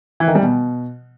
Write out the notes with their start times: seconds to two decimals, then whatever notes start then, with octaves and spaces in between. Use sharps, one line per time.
0.20 E3
0.28 D#3
0.35 G3
0.43 B2